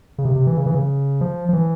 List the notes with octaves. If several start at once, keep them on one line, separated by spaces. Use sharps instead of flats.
C#3
C3
C3
E3
C#3
E3
C#3
F3
F3
E3